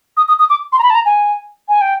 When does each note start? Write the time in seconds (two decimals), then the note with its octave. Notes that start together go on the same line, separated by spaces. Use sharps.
0.17 D#6
0.28 D#6
0.39 D#6
0.50 D6
0.72 C6
0.79 A#5
0.83 B5
0.90 A5
0.95 A#5
1.05 G#5
1.68 G#5
1.81 G5